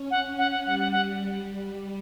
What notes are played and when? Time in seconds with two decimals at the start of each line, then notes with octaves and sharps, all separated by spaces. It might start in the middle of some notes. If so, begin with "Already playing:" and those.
Already playing: C#4
0.11 C#4 F#5
0.38 F#5
0.51 F#5
0.65 G3 F#5
0.79 F#5
0.92 F#5